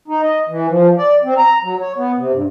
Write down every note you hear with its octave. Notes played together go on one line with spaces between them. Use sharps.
D#4
D#5
E3
F3
D5
C4
A#5
F#3
C#5
B3
C3
G2